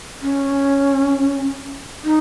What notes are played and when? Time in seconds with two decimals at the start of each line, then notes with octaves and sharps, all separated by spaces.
0.22 C#4
2.04 D#4